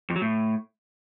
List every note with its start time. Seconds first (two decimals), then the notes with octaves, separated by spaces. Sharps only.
0.10 F2
0.16 F#3
0.22 A2